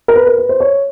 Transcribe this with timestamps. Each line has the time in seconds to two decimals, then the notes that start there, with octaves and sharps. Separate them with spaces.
0.08 A#4
0.16 B4
0.27 A#4
0.38 B4
0.49 C5
0.60 C#5